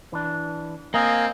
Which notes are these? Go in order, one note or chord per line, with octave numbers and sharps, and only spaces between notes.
E3 D4
A#3 C4 D#5 F5 G#5 A#5